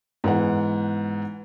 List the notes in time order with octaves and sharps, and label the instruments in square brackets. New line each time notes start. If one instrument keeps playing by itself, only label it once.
[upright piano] G#2 E3 B3 F#5